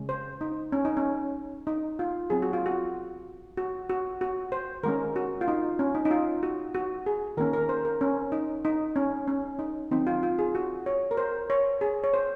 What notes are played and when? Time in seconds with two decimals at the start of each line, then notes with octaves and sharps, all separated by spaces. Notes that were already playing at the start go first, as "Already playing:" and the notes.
Already playing: C#3 G#3 C#4
0.09 C5
0.41 D#4
0.72 C#4
0.85 D#4
0.97 C#4
1.67 D#4
1.99 F4
2.30 F#3 C4 G#4
2.42 F#4
2.53 F4
2.66 F#4
3.57 F#4
3.89 F#4
4.21 F#4
4.52 C5
4.83 D#3 G#3 C#4 A#4
5.16 F#4
5.41 F4
5.48 D#4
5.79 C#4
5.95 D#4
6.05 D#4
6.11 F4
6.43 F#4
6.74 F#4
7.06 G#4
7.37 D#3 A#3 C#4 A#4
7.53 A#4
7.69 C5
7.85 A#4
8.01 C#4
8.32 D#4
8.65 D#4
8.96 C#4
9.28 C#4
9.59 D#4
9.91 D#3 F#3 C4 D#4
10.07 F4
10.23 F4
10.39 G#4
10.55 F#4
10.86 C#5
11.11 A#4
11.17 C5
11.50 C#5
11.81 G#4
12.04 C#5
12.13 C5